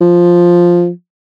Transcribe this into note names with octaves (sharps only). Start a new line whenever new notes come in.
F3